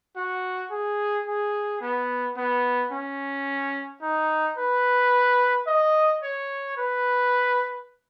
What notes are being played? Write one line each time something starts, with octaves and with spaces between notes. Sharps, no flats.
F#4
G#4
G#4
B3
B3
C#4
D#4
B4
D#5
C#5
B4